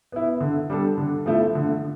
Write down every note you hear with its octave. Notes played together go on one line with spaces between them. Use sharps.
B3 E4
D3
G3 D4 A4
D3
F3 A3 E4 A4
D3